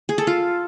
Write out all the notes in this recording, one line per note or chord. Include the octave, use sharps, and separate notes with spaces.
G#4
A4
F4